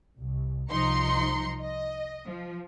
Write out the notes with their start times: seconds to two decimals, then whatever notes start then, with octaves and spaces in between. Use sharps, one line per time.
0.18 C2
0.71 C2 F3 D#4 A#5 C6 C#7
1.60 D#5
2.27 F3